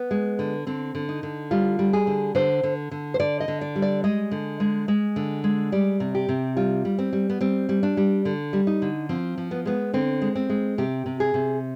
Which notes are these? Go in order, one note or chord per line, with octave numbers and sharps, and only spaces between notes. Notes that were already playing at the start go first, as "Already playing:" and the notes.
Already playing: B3
G#3
D3
D3 C4
D3
D#4
D3
G3 F4
G3
G#4
D3
D3 C5
D3
D3
C5
D3 D5
D#5
D3
D5
G3
D5
G#3 D#5
D3
G#3
G#3
D3
G#3
G3 D5
C3
G4
C3
G3 F4
G3
C4
G3
B3
G3 C4
G3
D4
G3
D3
G3
D#4
D3
F3 C4
F3
B3
G#3 B3
D3 C4
G#3
C4
G#3
C3 G4
C3
G#4
C3